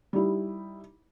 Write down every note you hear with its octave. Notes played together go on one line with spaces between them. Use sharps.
G3 D#4 E4 G4